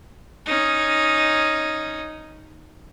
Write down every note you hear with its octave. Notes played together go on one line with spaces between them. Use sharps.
C#4 D#4